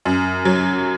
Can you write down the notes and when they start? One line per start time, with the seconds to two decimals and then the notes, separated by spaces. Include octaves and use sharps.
0.05 F#2
0.45 F#3